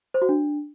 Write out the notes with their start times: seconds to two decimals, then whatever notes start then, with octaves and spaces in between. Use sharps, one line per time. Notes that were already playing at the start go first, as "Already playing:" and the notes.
0.14 C5
0.22 F#4
0.29 D4